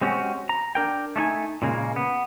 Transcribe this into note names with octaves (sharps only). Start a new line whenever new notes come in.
G#3 C4 C#4 F#4 G4
A#5
D4 A#4 G5
A3 D4 D#4 G#5
A#2 C#3 G#3 A#3
B3